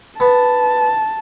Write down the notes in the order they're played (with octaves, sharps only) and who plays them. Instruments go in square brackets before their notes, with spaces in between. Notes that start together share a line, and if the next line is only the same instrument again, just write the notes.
[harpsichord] B3 [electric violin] A5